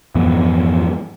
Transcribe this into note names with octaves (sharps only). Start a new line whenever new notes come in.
F2 G#2 E3 B3